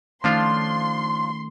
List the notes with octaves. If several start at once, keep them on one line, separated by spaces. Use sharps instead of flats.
D#3 F3 A3 C#4 D4 F4 C6